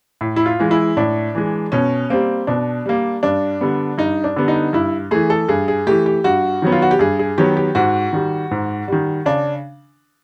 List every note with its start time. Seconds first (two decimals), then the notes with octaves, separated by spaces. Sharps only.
0.21 A2
0.36 E4
0.46 F4
0.59 E3 G#3
0.71 E4
0.97 A2 D4
1.35 E3 G#3
1.72 B2 C#4
2.10 G3 A#3 C4
2.47 B2 D4
2.86 G3 A#3
3.23 G2 D4
3.61 D3 G3 B3
3.98 G2 D#4
4.24 D4
4.36 D3 G3 B3
4.48 D#4
4.73 G2 E4
5.11 E3 A3 G#4
5.30 A4
5.49 G2 G#4
5.68 G#4
5.87 E3 A3 G4
6.06 G4
6.24 G2 F#4
6.62 D#3 F#3 B3
6.72 F4
6.82 F#4
6.91 G4
6.99 G2 G#4
7.19 G#4
7.38 D#3 F#3 B3 G4
7.57 G4
7.75 G#2 F#4
8.13 D#3 G3
8.51 G#2
8.88 D#3 G3
9.26 C#3 D4